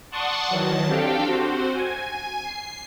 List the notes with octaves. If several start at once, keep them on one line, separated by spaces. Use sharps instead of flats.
D5 F#5 A5 C6 C#6 D#6
D#3 E3 F#3 A5
C4 D4 G4 A4 F5 G5
C4 F#4 C5
G#5
C7